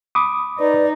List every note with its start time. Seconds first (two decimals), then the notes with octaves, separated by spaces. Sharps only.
0.15 B5 D6 D#6
0.60 D#4 B4 D5